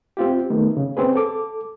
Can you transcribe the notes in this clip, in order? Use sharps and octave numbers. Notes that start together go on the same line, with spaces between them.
C4 F4 G4
D#3 A3 B3
C#3
C4 C#4 G#4 B4
A4 D6